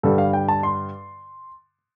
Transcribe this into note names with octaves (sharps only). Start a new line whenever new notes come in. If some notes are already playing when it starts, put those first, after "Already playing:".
G2 D3 G3 A4
F5
G5
A5
C6